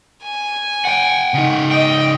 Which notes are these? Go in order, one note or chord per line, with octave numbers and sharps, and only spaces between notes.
G#5
F#5 G5
C#3 D#4
D#5 G5